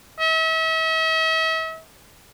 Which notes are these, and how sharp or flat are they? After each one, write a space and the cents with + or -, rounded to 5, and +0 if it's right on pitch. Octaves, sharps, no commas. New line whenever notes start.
E5 -40